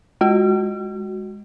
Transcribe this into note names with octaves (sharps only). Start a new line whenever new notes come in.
G#3 F#4